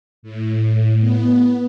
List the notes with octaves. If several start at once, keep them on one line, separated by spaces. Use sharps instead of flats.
A2
B3